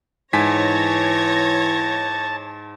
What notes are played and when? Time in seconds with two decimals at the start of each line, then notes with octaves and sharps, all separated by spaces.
0.33 G#2 E3 C#5 G#5 A5 G#6 A#6 B6